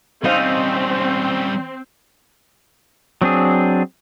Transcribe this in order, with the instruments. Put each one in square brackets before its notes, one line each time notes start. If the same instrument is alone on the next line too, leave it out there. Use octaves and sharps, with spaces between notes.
[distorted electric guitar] G3 C#4 [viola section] C4 [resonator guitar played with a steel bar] D#4 D#5 F5
[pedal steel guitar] F#3 C4 D4 G#4